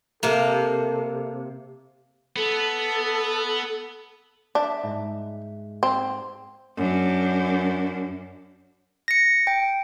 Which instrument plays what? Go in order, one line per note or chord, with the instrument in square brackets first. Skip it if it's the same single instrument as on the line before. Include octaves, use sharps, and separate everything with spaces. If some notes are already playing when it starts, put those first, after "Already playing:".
[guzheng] C3 A#3 [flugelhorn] A4
[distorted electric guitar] B3 [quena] A4
[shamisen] D4 [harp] E5 G6 B6
[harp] G#2
[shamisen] C4 [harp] C6
[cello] F#2 D4
[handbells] A#6 C#7
G5